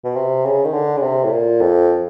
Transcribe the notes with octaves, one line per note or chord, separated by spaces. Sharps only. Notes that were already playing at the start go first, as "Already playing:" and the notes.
B2
C3
C#3
D#3
D3
C#3
C3
A2
A#2
F2